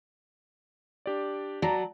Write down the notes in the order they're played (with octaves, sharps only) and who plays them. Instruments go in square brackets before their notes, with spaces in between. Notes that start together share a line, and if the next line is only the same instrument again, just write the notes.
[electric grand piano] D4 G4 D5
[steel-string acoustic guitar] F#3 [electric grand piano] D5 A5 A#5